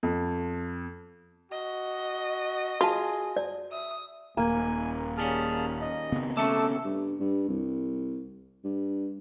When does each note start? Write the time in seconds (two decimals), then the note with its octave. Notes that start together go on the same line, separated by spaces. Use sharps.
0.03 F2
1.51 F#4 D#5
2.81 F4 F#4 G#4 A5
3.37 D5
3.71 E5 D#6
4.37 D#1 A#3 G#5
5.18 D#2 G3 C#4 G#4 A5 F6
5.81 D#5
6.12 C#3 B3 C4
6.37 A3 C#4 A4 A5 D6 E6
6.84 G2
7.20 G2
7.49 C2
8.64 G2